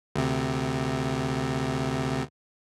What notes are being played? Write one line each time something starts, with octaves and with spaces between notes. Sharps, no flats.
D2 C3